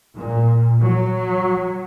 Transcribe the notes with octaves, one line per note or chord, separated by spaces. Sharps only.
A#2
F#3